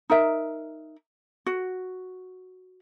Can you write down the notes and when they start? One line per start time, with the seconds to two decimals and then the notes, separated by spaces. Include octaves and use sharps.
0.10 D#4 A#4 E5
1.46 F#4